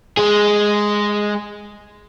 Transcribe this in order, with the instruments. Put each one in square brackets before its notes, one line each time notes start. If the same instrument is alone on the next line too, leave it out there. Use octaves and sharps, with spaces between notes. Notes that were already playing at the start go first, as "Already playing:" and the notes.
[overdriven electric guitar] G#3 G#4